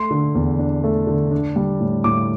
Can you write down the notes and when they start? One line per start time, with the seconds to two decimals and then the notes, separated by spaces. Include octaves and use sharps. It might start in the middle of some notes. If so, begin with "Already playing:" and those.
Already playing: A3 C6
0.11 D3
0.35 E2
0.59 D4
0.84 A3
1.07 D3
1.31 D4
1.56 G3
1.80 A2
2.04 A2 D6